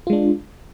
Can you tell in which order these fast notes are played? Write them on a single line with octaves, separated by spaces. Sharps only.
F4 G#3 D4